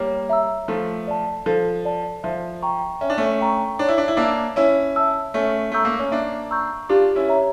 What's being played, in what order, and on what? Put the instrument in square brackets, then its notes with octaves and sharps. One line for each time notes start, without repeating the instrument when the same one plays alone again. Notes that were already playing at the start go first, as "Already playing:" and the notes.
Already playing: [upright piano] G3 A#3 [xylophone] C#5
[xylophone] E5 A#5 E6
[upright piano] F3 A3 [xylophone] A4
[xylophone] D5 A5
[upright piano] F3 [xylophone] A4
[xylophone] D5 A5
[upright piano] F3 [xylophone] E5
[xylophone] G5 A#5 C#6
[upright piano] C#4 [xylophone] E5
[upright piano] D4
A3 C#4
[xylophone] G5 A#5 C#6
[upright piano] D4 [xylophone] C#5
[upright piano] E4
D4
E4
[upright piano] A#3 D4 [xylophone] E5 A5 E6
[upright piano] C#4 E4 [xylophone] C#5
[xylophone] E5 A5 E6
[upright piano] A3 C#4 [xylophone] E5
[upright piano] A3 [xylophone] A#5 C#6 E6 G6
[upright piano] A#3
C#4
[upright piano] A#3 D4 [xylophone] E5
[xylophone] A#5 C#6 E6 G6
[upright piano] D4 F4 [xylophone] G4
[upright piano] C#4 E4
[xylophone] C#5 E5 A#5